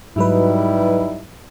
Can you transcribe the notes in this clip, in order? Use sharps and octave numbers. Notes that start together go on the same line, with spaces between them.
G#2 F#3 G3 D#4 E4 B4